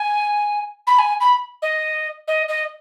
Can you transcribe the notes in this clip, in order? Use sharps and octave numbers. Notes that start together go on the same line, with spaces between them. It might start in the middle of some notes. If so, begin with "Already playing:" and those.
Already playing: G#5
B5
G#5
B5
D#5
D#5
D#5